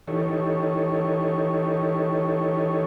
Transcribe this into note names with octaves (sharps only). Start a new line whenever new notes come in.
E3 D#4 G4 A4 C#5